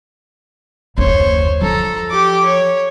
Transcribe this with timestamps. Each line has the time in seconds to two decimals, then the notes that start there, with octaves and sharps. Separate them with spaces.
0.98 F#1 D#2 C5 C#5
1.62 F3 A4 A#5
2.11 G4 D6
2.45 C#5